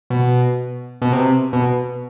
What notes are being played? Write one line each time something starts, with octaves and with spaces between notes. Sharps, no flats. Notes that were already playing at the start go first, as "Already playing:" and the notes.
B2
B2
C3
B2